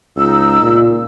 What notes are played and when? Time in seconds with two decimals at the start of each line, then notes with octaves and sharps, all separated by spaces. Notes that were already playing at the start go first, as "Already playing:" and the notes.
0.16 C#2 D#4 E6
0.62 A#2